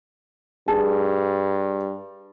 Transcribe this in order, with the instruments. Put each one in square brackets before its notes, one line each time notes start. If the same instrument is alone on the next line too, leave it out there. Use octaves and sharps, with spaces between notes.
[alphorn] G2 [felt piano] G#4 A5